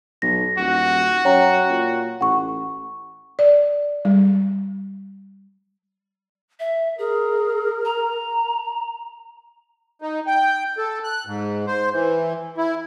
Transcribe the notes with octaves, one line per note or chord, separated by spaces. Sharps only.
B1 A#6
D#1 F#4
F#2 C#5 G5 A#5
A#2
A1 F#5 C#6
D5
G3
E5
G#4 A#4
A#5
D#4
G5
A4
F#6
G#2
C5
E3
E4